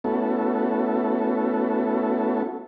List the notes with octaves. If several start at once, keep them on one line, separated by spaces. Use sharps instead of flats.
A3 B3 C#4 E4 F#4 A4